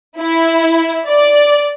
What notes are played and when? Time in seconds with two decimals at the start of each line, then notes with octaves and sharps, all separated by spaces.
0.19 E4
1.08 D5